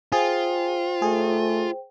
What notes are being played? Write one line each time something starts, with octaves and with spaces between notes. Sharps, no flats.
F4 G#4 C5 G5
A3 G#4